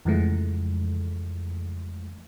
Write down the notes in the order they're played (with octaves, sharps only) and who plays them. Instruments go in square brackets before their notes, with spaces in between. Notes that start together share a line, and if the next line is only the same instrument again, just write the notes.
[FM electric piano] F2 C#3 E3 F3 G#3 A3